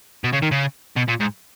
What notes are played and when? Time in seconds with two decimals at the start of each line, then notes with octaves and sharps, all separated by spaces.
0.24 B2
0.33 C#3
0.42 D#3
0.51 C#3
0.96 B2
1.08 A#2
1.20 G#2